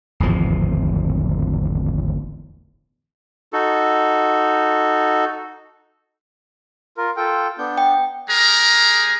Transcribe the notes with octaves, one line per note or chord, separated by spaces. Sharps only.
D1 G#1 E2 F3
D#4 F#4 A4
F4 A#4
F4 A4 G5
B3 D4 G6
G5
G3 G#4 A#4 A#5